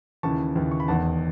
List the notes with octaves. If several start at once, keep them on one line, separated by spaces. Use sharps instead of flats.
D#2 C#3 E3 A5 C#6
D#2 C#3 E3
C#6
B5
E1 E2 D#3 F#5 A5